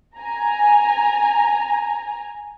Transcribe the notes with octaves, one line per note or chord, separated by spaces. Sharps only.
G#5 A#5